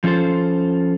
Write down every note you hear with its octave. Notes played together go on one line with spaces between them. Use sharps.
F3 C#4 F4 A4 C5